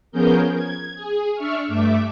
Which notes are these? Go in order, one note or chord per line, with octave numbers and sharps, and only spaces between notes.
F3 B3 C#4 G#4 A#4 G6
G#6
G#4
D4 E5 C#6 F6
G2 A3 E5 D6